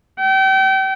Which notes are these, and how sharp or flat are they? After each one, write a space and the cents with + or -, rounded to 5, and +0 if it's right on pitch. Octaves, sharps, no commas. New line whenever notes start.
G5 -35